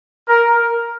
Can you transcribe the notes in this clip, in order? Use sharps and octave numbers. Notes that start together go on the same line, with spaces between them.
A#4